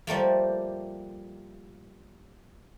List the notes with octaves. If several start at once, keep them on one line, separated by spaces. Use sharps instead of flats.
F3 G3 A3 A#3